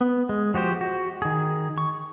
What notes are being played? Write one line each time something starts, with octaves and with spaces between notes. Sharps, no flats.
B3
G#3
F3 F#4 G4 C5
F#4
D#3 G#4
C#6